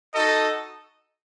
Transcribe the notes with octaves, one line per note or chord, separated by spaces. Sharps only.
D#4 F#4 A4 D#5